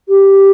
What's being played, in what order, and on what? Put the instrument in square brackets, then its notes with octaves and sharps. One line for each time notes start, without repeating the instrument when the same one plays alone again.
[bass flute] G4